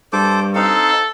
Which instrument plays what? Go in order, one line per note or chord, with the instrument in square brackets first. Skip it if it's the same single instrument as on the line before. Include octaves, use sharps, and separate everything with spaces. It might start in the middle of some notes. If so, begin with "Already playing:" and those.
[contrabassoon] G2 [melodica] A4 C5 D6
[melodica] C4 D#4 F5 [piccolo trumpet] A4